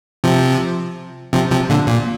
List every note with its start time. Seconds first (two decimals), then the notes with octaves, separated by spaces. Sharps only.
0.24 C3 F3
1.33 C3 F3
1.51 C3 F3
1.69 A#2 D3
1.87 A#2